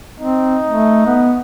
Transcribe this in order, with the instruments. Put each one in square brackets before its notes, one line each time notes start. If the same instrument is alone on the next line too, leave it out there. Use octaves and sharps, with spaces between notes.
[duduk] C4 [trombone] D#4
[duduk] A3
B3